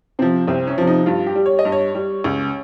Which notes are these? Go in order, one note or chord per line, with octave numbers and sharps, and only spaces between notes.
C3 F3 C4
C2 C4
C#4
C3 F3
D#4
G2 F4
G4
G3
C#5
D#5
G2
C#5
G3
C#2